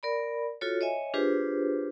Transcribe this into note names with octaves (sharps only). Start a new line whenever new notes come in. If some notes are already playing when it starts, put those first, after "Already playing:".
A#4 D5 B5
F4 F#4 A4 C#5
C#5 D#5 E5 G#5
D4 F4 G4 G#4 B4 C5